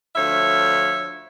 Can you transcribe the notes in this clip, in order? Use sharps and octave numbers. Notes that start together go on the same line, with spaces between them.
D2 F3 C#5 E5